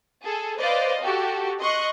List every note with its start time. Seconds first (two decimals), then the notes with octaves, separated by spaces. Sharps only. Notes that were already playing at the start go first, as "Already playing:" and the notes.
0.22 G#4 A4
0.59 B4 C5 D5 D#5 F5
1.01 F#4 G4 A4
1.59 D#5 C6 C#6 F#6